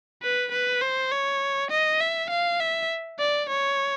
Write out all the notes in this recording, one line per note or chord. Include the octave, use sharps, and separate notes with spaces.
B4
B4
C5
C#5
D#5
E5
F5
E5
D5
C#5